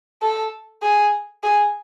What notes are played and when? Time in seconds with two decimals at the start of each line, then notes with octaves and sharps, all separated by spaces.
0.22 A4
0.82 G#4
1.43 G#4